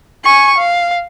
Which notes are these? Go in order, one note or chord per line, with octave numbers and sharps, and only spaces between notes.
G#5 C#6
F5